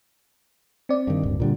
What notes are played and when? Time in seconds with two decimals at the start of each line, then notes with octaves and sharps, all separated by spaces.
0.89 C4 D5
1.07 G2 D#3
1.23 D1 G2
1.40 A#2 D3 G3